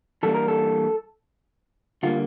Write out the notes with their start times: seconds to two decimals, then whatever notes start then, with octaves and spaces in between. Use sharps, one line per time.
0.23 E3 G3 A#3 D4 A4
0.35 A#4
0.48 A4
2.03 D3 G3 A#3 F4